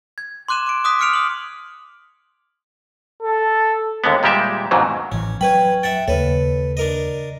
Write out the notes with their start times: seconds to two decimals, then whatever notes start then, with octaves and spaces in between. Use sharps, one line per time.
0.18 G#6
0.48 C6 D6 F#6 D#7 E7
0.66 D6 D7
0.84 D6 D#6 F#6 B6
0.99 D6 D#6 F6 C#7 D7 F7
1.13 D#6 F#7
3.23 A4
4.04 D#2 D3 G#3 B3
4.23 A#2 G3 G#3 G4 E5
4.71 F2 G#2 B2 D#3 E3 F#3
5.12 A1 E3 C#4
5.41 F#3 C#4 B4 G5 B5 G#6
5.83 E5 F#5 G5 A6
6.08 D#2 C#3 A4 B4 C#5
6.77 D4 A#4 D#5